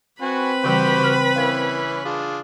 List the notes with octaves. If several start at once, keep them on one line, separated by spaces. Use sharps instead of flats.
C4 F#4 B4 G#5 B5
C#3 E3 G3 F#4 G4 C5
C#3 F6
E3 C#4 A#4 F5
D4 F4 G#4